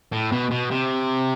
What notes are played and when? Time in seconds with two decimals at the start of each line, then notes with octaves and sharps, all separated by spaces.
0.12 A2
0.32 B2
0.51 B2
0.71 C3